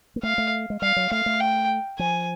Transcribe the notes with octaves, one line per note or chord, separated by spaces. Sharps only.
A#3
A3 F5
A3
G#3
G3 F5
F#3
A3 F5
A3
G5
F3 G#5